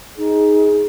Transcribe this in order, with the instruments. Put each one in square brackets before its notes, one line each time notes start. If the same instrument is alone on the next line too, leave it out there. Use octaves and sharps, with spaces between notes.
[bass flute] D#4 [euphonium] G#4